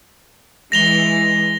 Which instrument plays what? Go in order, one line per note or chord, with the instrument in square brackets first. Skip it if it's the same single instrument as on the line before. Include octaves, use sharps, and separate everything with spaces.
[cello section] E3 G#3 [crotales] A#6 F7 G7